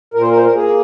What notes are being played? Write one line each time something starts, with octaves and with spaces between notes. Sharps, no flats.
A#2 A#4
C5
A#4
C5
A#4
A#3 G#4